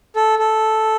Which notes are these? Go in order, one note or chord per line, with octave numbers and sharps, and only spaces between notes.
A4
A4